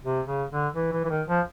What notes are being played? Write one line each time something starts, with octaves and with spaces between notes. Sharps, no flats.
C3
C#3
D3
E3
E3
E3
D#3
F3